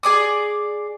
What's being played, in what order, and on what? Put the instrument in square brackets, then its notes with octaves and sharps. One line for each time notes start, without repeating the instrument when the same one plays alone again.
[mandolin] G#4 D5 D#6